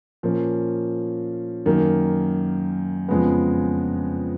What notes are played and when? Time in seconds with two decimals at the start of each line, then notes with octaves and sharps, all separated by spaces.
0.23 A#2 F3 A#3 C#4
1.66 F#2 D#3 A#3
3.09 F2 C#3 G#3 B3